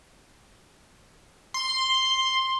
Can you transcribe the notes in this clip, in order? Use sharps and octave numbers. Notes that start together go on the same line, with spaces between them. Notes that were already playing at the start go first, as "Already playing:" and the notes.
C6